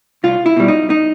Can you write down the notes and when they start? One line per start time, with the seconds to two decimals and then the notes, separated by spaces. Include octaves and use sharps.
0.24 C2 F4
0.46 E4
0.56 B2 G3
0.68 D#4
0.90 D#4